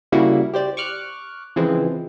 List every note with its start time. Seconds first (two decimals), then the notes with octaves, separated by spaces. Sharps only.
0.12 C#3 G3 A#3 E4 F#4
0.54 G4 C5 D5
0.77 C#6 D6 F6 F#6
1.56 C#3 E3 F3 G#3 C4